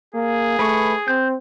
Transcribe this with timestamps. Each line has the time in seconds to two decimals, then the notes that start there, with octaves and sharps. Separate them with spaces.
0.15 A#3 G#4
0.59 A3 B4 B5 C#6
1.08 C4 G6